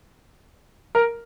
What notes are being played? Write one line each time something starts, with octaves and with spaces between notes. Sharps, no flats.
A#4